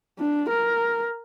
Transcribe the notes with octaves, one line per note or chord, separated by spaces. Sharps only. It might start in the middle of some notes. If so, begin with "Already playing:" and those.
D4
A#4